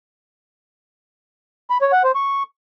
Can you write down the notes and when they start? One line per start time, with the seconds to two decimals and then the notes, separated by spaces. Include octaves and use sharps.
1.70 B5
1.81 C#5
1.93 F#5
2.04 C5
2.15 C#6